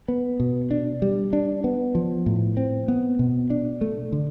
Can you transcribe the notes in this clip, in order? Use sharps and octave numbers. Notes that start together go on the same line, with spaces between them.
B3
B2
D4
G3
D4
B3
F3
A2
C4
B3
B2
D4
A3
D3